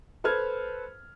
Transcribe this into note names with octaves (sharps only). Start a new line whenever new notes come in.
A4 B4 C5 F6 G#6